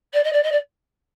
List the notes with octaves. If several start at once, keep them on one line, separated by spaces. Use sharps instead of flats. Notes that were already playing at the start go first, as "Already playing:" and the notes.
D5
D#5
D5
D#5
D5